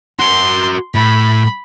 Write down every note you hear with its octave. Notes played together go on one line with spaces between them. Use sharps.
F#4 A#4 C6
A2 B5